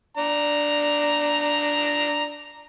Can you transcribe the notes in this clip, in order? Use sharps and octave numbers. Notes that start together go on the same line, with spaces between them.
D4 A#5